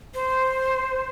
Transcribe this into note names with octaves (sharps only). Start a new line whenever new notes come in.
C5